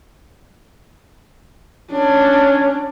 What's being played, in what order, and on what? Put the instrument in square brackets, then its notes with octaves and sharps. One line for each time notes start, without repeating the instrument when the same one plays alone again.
[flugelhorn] C#4 [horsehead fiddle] D4